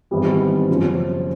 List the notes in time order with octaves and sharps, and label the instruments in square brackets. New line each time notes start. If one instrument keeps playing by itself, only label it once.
[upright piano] G#1 G#2 E3 G3 B3
F#1 F#2 C#3 F3